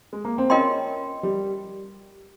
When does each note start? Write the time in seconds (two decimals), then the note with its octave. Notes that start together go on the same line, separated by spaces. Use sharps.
0.13 G#3
0.25 A#3
0.38 C4
0.50 C#4 F4 A#4 D#5 G5 C6
1.23 G3